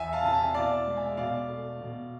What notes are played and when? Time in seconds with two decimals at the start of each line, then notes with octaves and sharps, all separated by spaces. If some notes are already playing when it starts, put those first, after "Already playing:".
Already playing: E2 E5 G#5
0.13 F5 A5
0.23 C3 E3 A5
0.34 E5 G#5
0.54 B2 D5 F5
0.87 G#3
0.96 E5 G#5
1.17 B2 D5 F5
1.48 A3
1.80 B2